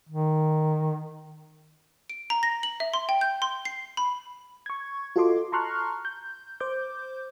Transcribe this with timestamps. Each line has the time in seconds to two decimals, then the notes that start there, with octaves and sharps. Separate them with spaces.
0.09 D#3
2.10 D7
2.30 A#5
2.43 A#6
2.63 F#7
2.80 E5
2.94 C6
3.09 G5
3.21 G6
3.42 C6
3.65 C7
3.97 B5
4.66 C#6 G#6
5.16 F4 F#4 A4 D#5 C6 D6
5.52 A5 A#5 C6 C#6 F6 F#6
6.05 G6
6.60 C5 D6 G6